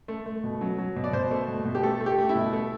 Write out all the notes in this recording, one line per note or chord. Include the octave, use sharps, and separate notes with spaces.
A3
A3
B2
F#3
F#3
B2
D5
B2 C5
A3
B2
B2
G4
A3 A4
A3
G4
A3
E4
B2
A3